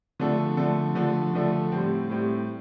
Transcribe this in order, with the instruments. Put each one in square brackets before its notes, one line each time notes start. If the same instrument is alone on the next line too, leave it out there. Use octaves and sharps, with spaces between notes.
[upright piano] D3 F3 A3 D4 A4
D3 F3 A3 D4 A4
D3 F3 A3 D4 A4
D3 F3 A3 D4 A4
A2 G3 C4
A2 G3 C4